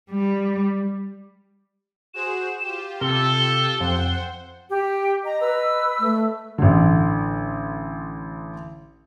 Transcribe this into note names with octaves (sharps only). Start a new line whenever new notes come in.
G3
F#4 G#4 C5 E7
F4 G4
C3 A4 G7
F2 C5 F#5 G5
G4
D#5 A#5
B4 E6
A3
A1 D3